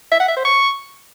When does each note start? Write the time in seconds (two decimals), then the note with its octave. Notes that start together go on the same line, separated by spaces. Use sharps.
0.12 E5
0.20 F#5
0.28 E5
0.36 C5
0.45 C#6